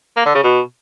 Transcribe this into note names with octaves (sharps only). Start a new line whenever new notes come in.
A#3
D3
C#3
B2